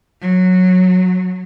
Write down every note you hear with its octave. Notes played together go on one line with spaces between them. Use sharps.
F#3